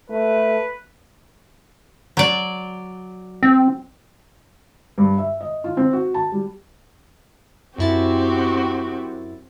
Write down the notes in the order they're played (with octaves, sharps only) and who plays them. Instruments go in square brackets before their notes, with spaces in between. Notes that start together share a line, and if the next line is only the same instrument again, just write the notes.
[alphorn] A3 [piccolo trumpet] B4
[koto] F#3 D5
[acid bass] C4
[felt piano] G2
E5
D#5
F4
C4
F#4
A5
G3
[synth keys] F#2 E4 A6 [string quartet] C4 F#4 G4